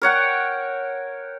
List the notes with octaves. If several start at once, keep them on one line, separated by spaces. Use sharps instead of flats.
A#4 C#5 F#5 G5